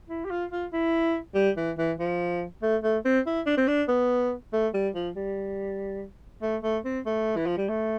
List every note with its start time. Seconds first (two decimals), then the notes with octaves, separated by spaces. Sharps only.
0.09 E4
0.25 G4
0.30 F4
0.51 F4
0.73 E4
1.35 G3
1.57 E3
1.78 E3
2.00 F3
2.62 A3
2.84 A3
3.05 C4
3.26 E4
3.46 D4
3.58 C4
3.68 D4
3.88 B3
4.53 A3
4.74 G3
4.95 F3
5.16 G3
6.42 A3
6.63 A3
6.85 C4
7.06 A3
7.36 E3
7.46 F3
7.58 G3
7.69 A3